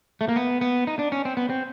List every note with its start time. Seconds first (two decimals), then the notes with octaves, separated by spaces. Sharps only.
0.21 A3
0.29 A#3
0.36 B3
0.61 B3
0.87 D#4
0.99 D4
1.12 C#4
1.25 C4
1.37 B3
1.50 C4